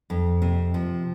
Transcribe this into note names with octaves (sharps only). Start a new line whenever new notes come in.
F2
C3
F3